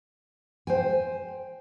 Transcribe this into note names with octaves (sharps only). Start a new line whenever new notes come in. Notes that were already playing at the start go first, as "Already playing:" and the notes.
C5 G5 G#5